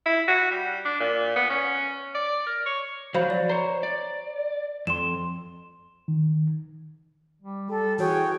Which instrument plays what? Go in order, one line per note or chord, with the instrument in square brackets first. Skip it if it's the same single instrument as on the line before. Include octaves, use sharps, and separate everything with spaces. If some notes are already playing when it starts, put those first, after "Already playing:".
[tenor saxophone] E4
F#4
G3
D4
A#2
B3
C#4
D5
A#4
C#5
[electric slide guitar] F3 F#3 [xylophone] C5 F5 B5
[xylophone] D5
[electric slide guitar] C5 C#5 [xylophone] A#5
[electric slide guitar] D5
[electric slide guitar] F2 [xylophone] C6 E7
[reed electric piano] D#3
[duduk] G3
[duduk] G3 [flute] A4
[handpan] E3 C#5 [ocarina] F#4 [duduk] G#4 [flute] G5